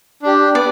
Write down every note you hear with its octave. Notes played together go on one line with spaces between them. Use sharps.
D4 G4
B3 D5